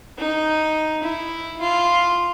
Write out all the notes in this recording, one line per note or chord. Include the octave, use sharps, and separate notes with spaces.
D#4
E4
F4